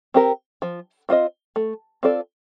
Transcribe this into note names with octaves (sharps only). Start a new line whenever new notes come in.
C4 G4 A#4
F3
C4 F4 C5 D#5
A3
C4 F4 A4 D5